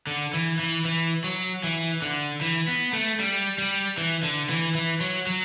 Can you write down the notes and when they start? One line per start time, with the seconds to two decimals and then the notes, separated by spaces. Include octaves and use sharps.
0.07 D3
0.33 E3
0.59 E3
0.85 E3
1.24 F#3
1.64 E3
2.02 D3
2.41 E3
2.68 B3
2.93 A3
3.20 G3
3.58 G3
3.98 E3
4.23 D3
4.50 E3
4.75 E3
5.01 F#3
5.27 F#3